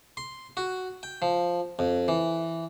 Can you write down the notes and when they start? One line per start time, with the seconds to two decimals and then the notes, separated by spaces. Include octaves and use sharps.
0.17 C6
0.57 F#4
1.03 G5
1.22 F3
1.79 F2
2.08 E3